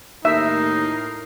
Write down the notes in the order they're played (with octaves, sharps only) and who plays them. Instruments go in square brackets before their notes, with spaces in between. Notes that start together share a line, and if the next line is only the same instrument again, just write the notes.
[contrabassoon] D#2 [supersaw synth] A2 A#4 C7 [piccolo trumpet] D#4 [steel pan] E5